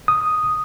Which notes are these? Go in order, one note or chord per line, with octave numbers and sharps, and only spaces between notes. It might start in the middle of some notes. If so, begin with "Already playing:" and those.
D#6